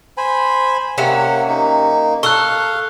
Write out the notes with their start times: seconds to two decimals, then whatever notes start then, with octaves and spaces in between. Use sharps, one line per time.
0.17 C5 G#5 B5
0.98 C3 A#3 C#4 E5 F#5
1.48 A#3 D#4
2.23 A4 F5 C#6 E6 F#6